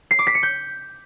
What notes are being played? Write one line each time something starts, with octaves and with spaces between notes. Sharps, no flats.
C7
D6
B6
C#7
G6